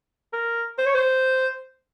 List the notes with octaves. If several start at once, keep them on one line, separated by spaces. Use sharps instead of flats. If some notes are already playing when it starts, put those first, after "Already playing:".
A#4
C5
C#5
C5